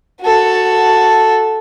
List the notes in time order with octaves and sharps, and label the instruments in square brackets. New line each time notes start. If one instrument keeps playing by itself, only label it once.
[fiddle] F#4 A4